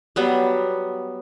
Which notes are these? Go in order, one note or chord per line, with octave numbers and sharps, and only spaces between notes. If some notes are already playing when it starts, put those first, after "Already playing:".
F#3 G3 B3